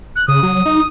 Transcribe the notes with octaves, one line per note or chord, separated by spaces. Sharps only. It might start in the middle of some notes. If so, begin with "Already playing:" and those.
F#6
C#3 D#6
F#3
D#4